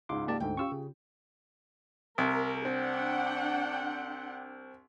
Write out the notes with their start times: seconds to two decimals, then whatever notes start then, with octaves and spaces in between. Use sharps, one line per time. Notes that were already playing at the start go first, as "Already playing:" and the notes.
0.09 C#2 G#2 C6 D6
0.28 A#3 G4 D5 A5
0.40 D2 G#2 D3 G5
0.57 C#4 F4 G4 C#6 E6
0.72 C#3
2.18 C2 A#4
2.65 C4 D4 F#5 G5